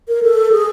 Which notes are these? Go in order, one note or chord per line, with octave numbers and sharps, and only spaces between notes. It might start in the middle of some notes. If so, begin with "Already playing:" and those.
A#4
A4
G#4